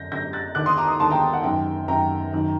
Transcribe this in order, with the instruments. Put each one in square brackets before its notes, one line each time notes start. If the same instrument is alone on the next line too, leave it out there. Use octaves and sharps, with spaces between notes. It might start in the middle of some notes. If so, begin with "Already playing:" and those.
Already playing: [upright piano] F#2 D3 G6 A#6
F#2 D3 G6 A#6
F#6 A6
D#2 D3 D6 F#6
C6 D#6
A#5 D6
C6 D#6
D#2 D3 A5 C6
G5 A#5
F#5
F#2 D#3 G5
F#2 D#3 G5 A#5
F#2 D#3